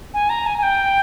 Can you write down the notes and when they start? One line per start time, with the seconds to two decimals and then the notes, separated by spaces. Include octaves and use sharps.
0.14 G#5
0.30 A#5
0.47 G#5
0.58 G#5
0.63 G5